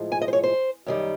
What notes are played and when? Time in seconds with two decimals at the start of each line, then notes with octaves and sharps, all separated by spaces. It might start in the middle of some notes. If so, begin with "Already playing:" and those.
Already playing: A2 F3 G#3
0.12 G#5
0.22 D#5
0.28 C5
0.33 C#5
0.44 C5
0.86 F#2 D#3 G3